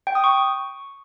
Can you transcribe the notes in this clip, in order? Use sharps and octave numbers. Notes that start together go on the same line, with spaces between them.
G5
D#6
C#6